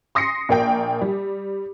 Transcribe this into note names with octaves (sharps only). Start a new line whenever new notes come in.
C6 D#6 A#6 C7 C#7
A#1 A#3 G5
G3